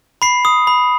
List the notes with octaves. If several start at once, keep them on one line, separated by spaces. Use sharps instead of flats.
B5 C7
D#6
B5